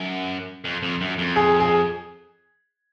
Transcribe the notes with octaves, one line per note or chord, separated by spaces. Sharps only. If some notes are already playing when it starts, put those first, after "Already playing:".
Already playing: F#2
F2
F2
F#2
F2
G#4
G#4